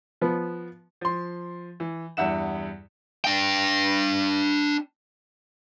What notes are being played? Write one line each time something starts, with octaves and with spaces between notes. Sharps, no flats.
F3 B3
F3 C6
E3
E2 G2 E5 F#5 E7
D4 G5